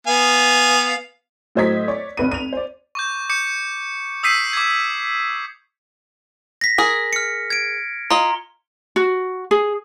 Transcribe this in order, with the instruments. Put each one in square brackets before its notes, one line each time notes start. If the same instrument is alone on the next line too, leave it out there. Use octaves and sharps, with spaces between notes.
[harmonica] B3 F5 G#5
[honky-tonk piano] A2 F#3 C5 D#5 G#6 B6
C#5 D5
F1 B4 D#7
D#7 F7
C5 D5
[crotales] C#6 D6 G6
D6 G6 C#7
D#6 E6 G6 B6 C7 D#7
D6 G#6
[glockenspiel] A#6 B6
[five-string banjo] G#4 A#4
[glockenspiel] F6 C#7
G#6 D7
[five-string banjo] F4 D#5 [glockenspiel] A#5 C6 G7
[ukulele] F#4
G#4